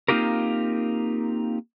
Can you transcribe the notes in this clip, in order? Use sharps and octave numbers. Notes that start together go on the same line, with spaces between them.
A#3 C4 D#4 F4 G4 A#4